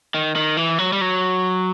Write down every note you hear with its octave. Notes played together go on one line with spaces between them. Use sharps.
D#3
D#3
E3
F#3
G3
F#3